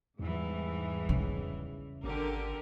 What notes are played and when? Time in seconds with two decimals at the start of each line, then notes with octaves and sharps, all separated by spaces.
0.19 E2 G#2 E3 G3
1.09 C#3
2.04 G#1 D3 G4 A#4